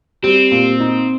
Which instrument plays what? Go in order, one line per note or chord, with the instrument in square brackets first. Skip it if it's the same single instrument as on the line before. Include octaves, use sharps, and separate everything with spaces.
[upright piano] G3 [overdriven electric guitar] C4
[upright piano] A#2
D#4